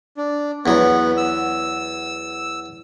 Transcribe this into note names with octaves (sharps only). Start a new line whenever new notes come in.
D4
E2 F#3 B3
E6